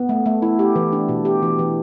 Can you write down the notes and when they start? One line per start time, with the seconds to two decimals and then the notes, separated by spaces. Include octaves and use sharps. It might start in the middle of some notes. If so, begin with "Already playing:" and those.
Already playing: B3
0.09 A3
0.26 A3
0.42 E4
0.59 G4
0.75 E3
0.93 D4
1.09 B2
1.25 G4
1.42 E3
1.59 E3